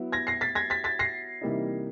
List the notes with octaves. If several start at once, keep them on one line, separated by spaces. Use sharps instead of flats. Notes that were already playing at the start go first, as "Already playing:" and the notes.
Already playing: F#3 B3 E4
G#6 A#6
A#6 C7
A6 B6
G#6 A#6
A6 B6
A6 B6
A#6 C7
C3 E3 G3 A#3 D#4